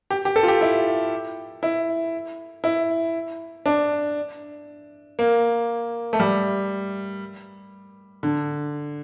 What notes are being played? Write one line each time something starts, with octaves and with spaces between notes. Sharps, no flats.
G4
G4
A4
F4
G4
E4
E4
E4
D4
A#3
A3
G3
D3